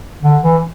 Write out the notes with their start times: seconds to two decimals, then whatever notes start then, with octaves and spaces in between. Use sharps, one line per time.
0.23 D3
0.42 E3